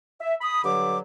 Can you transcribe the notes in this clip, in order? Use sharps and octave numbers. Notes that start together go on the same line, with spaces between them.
E5
B5 D#6
G2 D3 F#3 D6